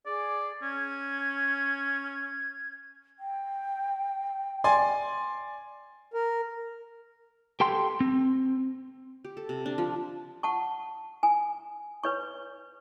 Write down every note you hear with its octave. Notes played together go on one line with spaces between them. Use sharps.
G#4 D5
C#4 G#6
G5
D5 G#5 C6
A#4
G4 A4 G5 C6
C4
G4
A4
C3
D4
F3
F#5 A5 C#6
G#5
B4 C#5 C#6